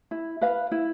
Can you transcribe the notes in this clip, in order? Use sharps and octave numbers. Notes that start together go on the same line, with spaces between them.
E4
B4 F5
E4